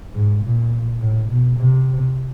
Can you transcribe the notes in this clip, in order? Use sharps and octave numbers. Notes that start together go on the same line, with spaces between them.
G#2
A#2
A2
B2
C3